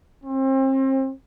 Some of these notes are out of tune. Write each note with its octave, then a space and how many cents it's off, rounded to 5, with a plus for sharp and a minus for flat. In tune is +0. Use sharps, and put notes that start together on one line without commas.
C4 +35